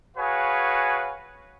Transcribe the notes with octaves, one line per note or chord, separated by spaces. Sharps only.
F#4 G#4 B4 C#5 F5 G#5